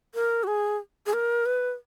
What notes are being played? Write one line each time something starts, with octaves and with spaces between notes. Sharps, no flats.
A#4
F#4
G#4
G#4
A#4
B4